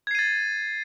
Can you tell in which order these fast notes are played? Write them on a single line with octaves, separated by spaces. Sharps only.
G#6 C7 D#7 A6